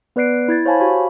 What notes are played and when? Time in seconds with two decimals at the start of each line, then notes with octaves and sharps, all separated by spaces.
0.16 B3 B4 D5 F#6 C7 D7
0.48 E4 G#6 A6
0.66 C5 C#5 F5 G#5 A5 B5
0.80 F#4 G4 F5 B5